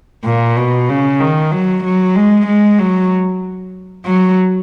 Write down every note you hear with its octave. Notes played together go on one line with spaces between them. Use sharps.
A#2
B2
C#3
D#3
F#3
F#3
G#3
G#3
F#3
F#3